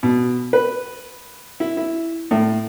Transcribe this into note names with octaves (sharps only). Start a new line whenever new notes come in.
B2
B4
E4
E4
A2